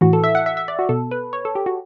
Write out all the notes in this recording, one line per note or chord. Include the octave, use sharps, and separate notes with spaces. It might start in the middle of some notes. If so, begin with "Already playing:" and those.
A2 E3 F#4
A4
E5
F#5
E5
E5
D5
F#4
B2 A4
B4
C#5
A4
G4
F#4